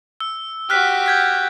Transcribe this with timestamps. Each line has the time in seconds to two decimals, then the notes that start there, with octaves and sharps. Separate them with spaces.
0.20 E6
0.70 F#4 G4 F6 F#6 B6
1.06 G6 G#6 B6